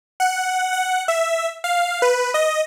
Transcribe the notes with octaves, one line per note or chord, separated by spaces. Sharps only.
F#5
F#5
E5
F5
B4
D#5